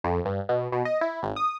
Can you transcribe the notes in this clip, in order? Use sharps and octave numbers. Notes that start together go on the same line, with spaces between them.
F2
G2
B2
B2
D#5
E4
G#1
D#6